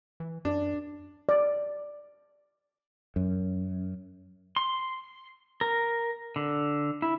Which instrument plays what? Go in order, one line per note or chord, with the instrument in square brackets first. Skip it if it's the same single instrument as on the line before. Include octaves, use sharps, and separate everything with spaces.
[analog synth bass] E3
[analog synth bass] F#2 [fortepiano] D4
[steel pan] D5
[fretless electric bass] F#2
[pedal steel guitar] C6
A#4
D3
E4